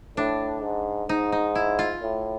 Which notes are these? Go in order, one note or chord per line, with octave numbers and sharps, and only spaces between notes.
A2 D4
G#2
G#2 D#4
D#4
E4
F4
A2